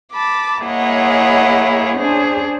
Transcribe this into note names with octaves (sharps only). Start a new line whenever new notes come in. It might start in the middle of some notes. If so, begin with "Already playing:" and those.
A5 B5 D6
A#3 E4 G#4 C#5 D#5 F#5
C#4 D4 G#4 C5